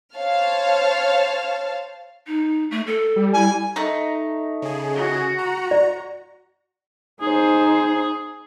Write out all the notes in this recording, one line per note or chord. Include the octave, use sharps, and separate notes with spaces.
C5 C#5 F5 A5 F6
D#4
A3
A4
G3
E4 G#5
A3 D#4
C#3 G#4
F#4
A#5
D5
D#4 G#4 C5